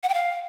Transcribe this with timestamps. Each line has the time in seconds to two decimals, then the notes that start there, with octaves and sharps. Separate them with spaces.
0.03 F#5
0.09 G5
0.14 F5